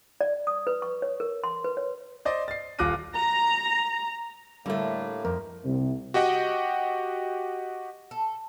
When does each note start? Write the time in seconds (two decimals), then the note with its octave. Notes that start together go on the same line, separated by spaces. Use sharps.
0.21 D5
0.47 D#6
0.67 B4
0.82 C#6
1.02 C#5
1.20 A#4
1.44 C6
1.64 B4
1.77 C#5
2.25 C5 D5 D#5
2.48 A6 C7
2.79 D#1 F4 D6 F#6 A#6 D#7
3.15 A#5
4.66 A2 D3 G3 A3 A#3
5.25 F2 A#4
5.65 C2
6.14 F#4 G4 D#5 F#5 G5
8.11 A4